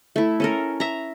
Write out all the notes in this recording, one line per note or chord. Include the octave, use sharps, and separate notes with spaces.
A3 E4
C#4 A4 A#4
E5 A#5